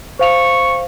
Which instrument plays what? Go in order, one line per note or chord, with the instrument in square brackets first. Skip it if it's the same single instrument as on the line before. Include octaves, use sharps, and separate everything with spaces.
[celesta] C5 F5 F7 [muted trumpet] C#6